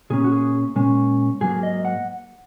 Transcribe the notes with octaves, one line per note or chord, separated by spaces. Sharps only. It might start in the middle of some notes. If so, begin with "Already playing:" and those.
A#2 A#3 C#4 G#4
F#4
G#4
A#2 G#3 C#4
G#2 F#3 A#3 G#4
D#5
F#5